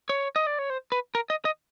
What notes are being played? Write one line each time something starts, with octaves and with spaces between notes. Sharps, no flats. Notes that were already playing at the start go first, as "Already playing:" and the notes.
C#5
D#5
D5
C#5
C5
B4
A#4
D#5
D#5